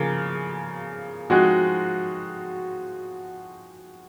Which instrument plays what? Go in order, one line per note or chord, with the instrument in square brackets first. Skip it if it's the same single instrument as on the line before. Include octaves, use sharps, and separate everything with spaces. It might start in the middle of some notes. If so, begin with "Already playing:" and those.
Already playing: [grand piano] C#3 F3 A#3 [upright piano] G#4 A#4
[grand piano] F3 G#3 C4 D#4 [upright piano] F#4